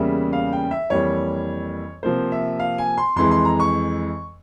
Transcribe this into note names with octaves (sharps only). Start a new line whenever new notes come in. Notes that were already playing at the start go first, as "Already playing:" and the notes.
Already playing: E2 C#3 G3 A#3 E5
F5
G5
E5
F2 E3 G3 A#3 C#5
C3 F3 A#3 C5
E5
F5
G#5
C6
F2 E3 G#3 C6
C6
A#5
C#6